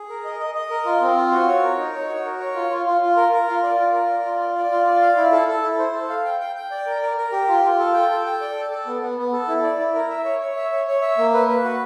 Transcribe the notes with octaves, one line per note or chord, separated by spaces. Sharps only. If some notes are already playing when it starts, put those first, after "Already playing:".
Already playing: G#4
A#4
D#5
D#5
D#5
A#4
F4
C4
F4
F#4
C#5
A#4
D#4
C#5
F#4
A#4
C#5
F4
F4
F4
F4
A#4
A#4
F4
D5
F4
A#4
D5
F4
D5
D5
F4
D5
F5
E4
A4
A4
E4
C5
A4
F5
G5
G5
G5
D5
A#4
A#4
A#4
G4
F4
F4
A4
G5
A4
G5
D5
A4
A4
B3
B3
B3
A4
E4
D5
E4
A#4
E5
C#5
C#5
E5
C#5
C#5
E5
A#3
B4
B4
F#4